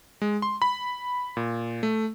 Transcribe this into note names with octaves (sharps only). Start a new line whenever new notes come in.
G#3
C6
B5
A#2
A3